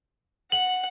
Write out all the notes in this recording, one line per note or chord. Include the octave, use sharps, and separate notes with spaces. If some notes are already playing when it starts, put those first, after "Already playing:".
F#5 F#7